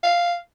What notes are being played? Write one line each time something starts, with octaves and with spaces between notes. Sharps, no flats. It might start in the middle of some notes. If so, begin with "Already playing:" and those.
F5